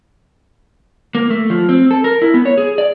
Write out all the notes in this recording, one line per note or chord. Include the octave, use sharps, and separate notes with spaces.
A#3
A3
F3
C4
A4
A#4
E4
B3
C#5
G#4
D5